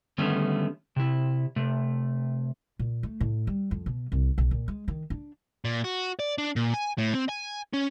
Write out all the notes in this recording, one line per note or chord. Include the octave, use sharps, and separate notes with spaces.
D3 D#3 G3 A3 B3 C#4
C3 E4
C3 A3
A#2
A3
A2
G3
F2
B2
C2
B1
A#2
G#3
D#3
D4
A#2
F#4
D5
D4
A#2
G#5
A2
C4
G#5
C#4